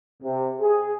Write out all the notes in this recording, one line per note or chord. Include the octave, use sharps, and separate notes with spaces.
C3
G#4